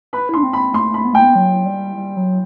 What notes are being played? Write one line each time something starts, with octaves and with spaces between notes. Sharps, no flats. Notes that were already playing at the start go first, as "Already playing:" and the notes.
B4 B5
E4
D4 C6
C4
B5
A3 C6
B5
B3
A3 G5
B3
F#3
G3
G3
F#3